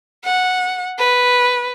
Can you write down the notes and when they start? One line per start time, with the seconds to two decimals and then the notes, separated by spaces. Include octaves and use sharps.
0.24 F#5
0.99 B4